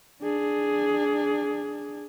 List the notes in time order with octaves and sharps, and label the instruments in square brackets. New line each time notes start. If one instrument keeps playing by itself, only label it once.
[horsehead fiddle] D4 G#4